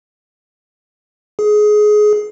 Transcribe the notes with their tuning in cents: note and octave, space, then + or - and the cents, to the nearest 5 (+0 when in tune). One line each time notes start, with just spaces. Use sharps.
G#4 +20